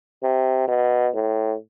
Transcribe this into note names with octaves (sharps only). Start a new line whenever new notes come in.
C3
B2
A2